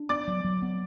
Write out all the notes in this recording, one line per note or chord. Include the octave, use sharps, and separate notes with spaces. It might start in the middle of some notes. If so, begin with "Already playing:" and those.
Already playing: D4
B3 D5 D6
F#3
F#3
B3